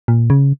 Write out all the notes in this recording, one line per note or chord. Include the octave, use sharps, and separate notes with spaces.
A#2
C#3